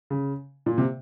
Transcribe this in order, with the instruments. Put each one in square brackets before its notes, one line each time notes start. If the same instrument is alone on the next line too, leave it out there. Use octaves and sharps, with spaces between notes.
[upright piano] C#3
A#2
C3